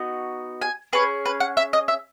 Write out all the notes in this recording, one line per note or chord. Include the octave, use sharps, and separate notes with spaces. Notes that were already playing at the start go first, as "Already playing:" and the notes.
Already playing: B3 D#4 F#4
G#5
C#4 G#4 B4
B4
F#5
E5
D#5
E5